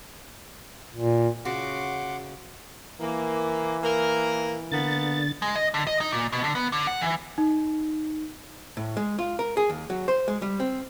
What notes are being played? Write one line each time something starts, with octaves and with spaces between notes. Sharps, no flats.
A#2
C#3 F#4 F#5 C6 D6
E3 A#3
A#3 A#4
D3 A#3 B3 A6
G#3
D#5
D3
D#5
D#4
A#2
B2
D3
B3
D3
F#5
E3
D#4
A2
G#3
F4
A#4
G#4
D#2
F#3
C5
G#3
G3
C4